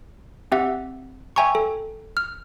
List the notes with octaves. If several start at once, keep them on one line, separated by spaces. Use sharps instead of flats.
C4 G4 E5 F#5
E5 G5 G#5 A#5 C#6
A4
F6